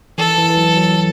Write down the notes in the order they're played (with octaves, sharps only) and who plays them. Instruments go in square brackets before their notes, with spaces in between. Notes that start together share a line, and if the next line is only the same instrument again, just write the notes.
[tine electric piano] E3 [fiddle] A4
[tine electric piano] E3
E3
F#3
F#3